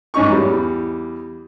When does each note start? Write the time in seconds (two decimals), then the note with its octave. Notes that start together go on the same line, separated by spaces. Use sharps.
0.14 G#2 C#4 D#4 C#6
0.30 E2 G3